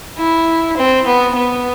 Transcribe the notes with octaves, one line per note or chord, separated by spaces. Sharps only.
E4
C4
B3
B3